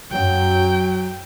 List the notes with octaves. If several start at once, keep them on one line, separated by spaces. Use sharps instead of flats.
F#2 F#3 G5